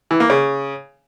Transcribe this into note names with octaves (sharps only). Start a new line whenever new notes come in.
E3
A#3
C#3